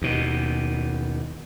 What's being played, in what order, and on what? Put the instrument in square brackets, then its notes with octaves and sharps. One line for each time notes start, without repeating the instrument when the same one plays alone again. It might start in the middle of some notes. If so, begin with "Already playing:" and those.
[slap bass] D#2 B2